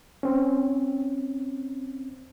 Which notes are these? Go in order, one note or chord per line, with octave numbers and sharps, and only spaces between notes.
C4 C#4